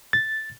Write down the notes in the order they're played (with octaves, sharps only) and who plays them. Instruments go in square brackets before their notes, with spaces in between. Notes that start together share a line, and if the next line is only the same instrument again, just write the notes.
[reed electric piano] A6